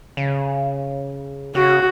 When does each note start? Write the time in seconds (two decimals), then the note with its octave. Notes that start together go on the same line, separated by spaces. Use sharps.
0.17 C#3
1.55 C#3 F#4